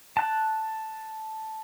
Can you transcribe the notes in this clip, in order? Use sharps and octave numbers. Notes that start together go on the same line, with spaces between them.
A5 F#6